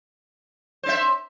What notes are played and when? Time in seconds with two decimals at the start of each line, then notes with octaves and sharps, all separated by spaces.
0.83 C5
0.86 C#4
0.89 E5